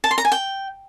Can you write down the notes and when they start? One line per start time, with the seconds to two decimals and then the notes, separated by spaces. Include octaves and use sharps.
0.04 A5
0.11 C6
0.18 A#5
0.25 G#5
0.32 G5